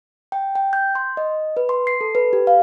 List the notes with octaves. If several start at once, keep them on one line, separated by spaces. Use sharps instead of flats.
G5
G5
G6
C6
D#5
B4
C6
C7
A4
B4
G4
F5